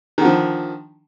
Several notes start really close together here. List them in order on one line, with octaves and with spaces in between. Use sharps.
D#3 D3 F3